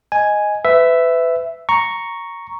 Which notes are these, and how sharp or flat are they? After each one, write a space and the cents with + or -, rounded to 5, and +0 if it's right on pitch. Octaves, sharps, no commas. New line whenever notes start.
D#5 +0 G#5 +0
B4 +30 E5 +0
A#5 +0 C#6 +0